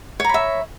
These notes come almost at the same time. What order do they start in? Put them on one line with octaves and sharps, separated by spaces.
C#5 A#5 B5 E5